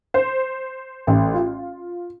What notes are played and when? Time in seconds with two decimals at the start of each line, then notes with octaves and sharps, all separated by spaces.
0.14 C5
1.07 A1
1.34 F4